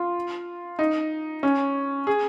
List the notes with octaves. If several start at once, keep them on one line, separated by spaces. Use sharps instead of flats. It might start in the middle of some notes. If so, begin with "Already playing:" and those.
Already playing: F4
D#4
C#4
G#4